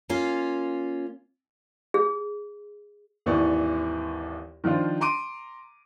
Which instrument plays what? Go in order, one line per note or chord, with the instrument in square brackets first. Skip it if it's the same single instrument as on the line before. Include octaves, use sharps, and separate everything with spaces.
[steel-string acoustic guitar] A#3 C#4 F4
[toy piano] G#4
[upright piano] G#1 D#2 E3 D5 C#6
D#3 F3 D4 F4 C5
A#5 C6 D6 D7 D#7